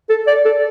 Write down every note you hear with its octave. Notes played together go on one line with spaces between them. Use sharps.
A4
D5
A4